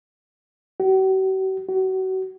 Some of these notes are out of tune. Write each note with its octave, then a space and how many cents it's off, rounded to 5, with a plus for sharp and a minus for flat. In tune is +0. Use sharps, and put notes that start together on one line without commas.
F#4 +45
F#4 +30